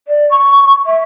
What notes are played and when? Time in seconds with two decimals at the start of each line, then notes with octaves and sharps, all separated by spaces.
0.07 D5
0.30 C#6
0.85 E5